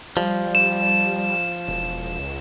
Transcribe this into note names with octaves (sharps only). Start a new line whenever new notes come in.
F3 G3
E7
E1
C#2